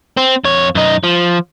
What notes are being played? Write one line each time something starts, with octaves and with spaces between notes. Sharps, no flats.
C4
F2 C#5
F#2 D#4
F3